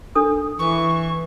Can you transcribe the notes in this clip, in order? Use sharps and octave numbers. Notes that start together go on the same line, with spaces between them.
D4 A4 D#6
E3 C#6